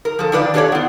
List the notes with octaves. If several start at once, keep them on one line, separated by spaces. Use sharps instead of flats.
A#4
F3 A4
D#3 D4 F4 B4 D5
D4 G4 A4 A#4 C#5 D5
B3 F4